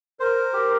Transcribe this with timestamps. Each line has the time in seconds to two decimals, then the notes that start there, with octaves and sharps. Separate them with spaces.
0.20 A#4 C5
0.53 G4